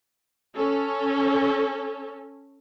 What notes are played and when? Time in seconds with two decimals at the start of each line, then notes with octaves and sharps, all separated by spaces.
0.55 C#4 A4